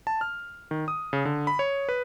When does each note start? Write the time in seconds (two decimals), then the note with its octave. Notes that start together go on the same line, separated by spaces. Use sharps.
0.07 A5
0.21 F6
0.71 D#3
0.88 D#6
1.13 C#3
1.25 D3
1.47 B5
1.59 C#5
1.89 B4